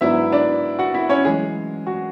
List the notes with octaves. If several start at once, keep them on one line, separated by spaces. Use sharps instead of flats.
G#2 F#3 B3 D4 E4 E5
D4 D5
F#4 F#5
E4 E5
C#4 C#5
F#2 E3 G#3 A3 G#4
F#4